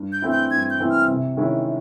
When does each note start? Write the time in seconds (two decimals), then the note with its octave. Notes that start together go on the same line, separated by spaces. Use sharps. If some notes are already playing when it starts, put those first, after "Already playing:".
Already playing: G2
0.13 G6
0.22 E3 A3 C4 E4
0.32 G6
0.51 G2 G#6
0.70 G6
0.80 E3 A3 C4 E4
0.90 F6
1.08 C3
1.37 D#3 G#3 C#4 E4